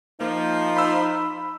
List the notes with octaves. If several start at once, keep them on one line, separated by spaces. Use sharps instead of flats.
F3 A#3 D#4
B5 E6